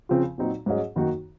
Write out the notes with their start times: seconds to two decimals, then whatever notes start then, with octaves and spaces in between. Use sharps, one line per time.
0.09 C#3 F3 C4 F4
0.38 A#2 F#3 C4 D#4 F#4
0.66 G#2 F#3 C#4 G#4 D#5
0.96 F#2 D#3 A#3 D#4 F#4